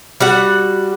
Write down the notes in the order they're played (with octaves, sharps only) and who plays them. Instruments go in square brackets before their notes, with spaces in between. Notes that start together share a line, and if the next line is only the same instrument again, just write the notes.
[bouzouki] G3 F#4 F#5